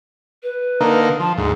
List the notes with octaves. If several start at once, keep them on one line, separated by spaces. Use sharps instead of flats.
B4
D3 A#3 D#4
F3 A5
D2 G#2 G#4